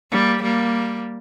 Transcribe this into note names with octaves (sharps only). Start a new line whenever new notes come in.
G3 A#3
G3 A#3